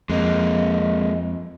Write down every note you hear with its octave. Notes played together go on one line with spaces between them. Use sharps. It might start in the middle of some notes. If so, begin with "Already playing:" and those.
F2 G#3 A#3 D#5